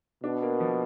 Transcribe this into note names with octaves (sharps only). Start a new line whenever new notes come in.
B2 D4
A#3
F3